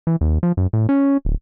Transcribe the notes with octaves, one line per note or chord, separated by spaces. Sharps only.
E3
D#2
F3
F#2
A2
C#4
D1